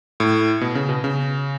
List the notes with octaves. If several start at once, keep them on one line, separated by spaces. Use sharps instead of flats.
A2
B2
C#3
B2
C#3